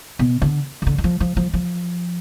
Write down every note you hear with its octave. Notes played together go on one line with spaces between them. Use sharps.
B2
D3
D#3
D3
D#3
F3
F3
F3
F3